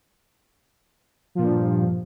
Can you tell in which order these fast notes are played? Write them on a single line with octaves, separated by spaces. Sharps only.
F3 A#2 G2